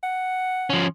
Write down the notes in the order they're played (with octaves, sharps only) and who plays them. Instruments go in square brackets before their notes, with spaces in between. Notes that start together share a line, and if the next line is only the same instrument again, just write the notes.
[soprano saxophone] F#5
[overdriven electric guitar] F3 C#4